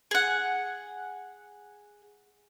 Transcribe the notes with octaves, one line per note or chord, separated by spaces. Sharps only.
G#4 F#5